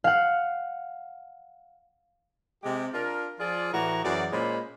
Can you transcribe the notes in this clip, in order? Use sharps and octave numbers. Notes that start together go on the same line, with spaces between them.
F5 F#5
C3 G#3 G4
D4 F4 A#4
F3 F4 G#4 D5
A2 E3 F#4 A#5
F#2 E3 F#4 G#4 D5
A#2 G#3 C#4 C5 B5